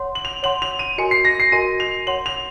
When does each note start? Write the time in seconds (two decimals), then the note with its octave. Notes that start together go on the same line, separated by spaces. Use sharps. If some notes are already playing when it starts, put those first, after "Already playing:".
Already playing: C#5 F#5 C6
0.15 F#7
0.25 F7
0.43 C#5 F#5 C6 F#7
0.62 F7
0.79 D#7
0.98 F#4 A#4 D#5 G#5 C6 C#7
1.11 C7
1.25 A#6
1.40 C7
1.52 F#4 A#4 D#5 G#5 C6 D#7
1.80 F7
2.07 C#5 F#5 C6 F#7
2.26 F7